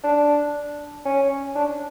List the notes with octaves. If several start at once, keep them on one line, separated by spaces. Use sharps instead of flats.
D4
C#4
D4